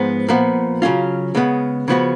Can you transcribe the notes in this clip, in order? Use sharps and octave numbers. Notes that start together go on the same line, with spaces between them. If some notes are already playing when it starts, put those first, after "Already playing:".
Already playing: G#2 F3 G#3 B3
A#2 F3 B3
C#3 F#3 C#4 F4
C#3 G#3 B3
C#3 F3 B3 F#4